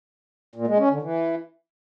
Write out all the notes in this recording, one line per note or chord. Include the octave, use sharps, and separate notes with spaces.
A#2
G#3
C#4
D3
E3